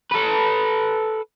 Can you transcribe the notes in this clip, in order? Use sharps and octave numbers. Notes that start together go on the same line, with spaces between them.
A4 B4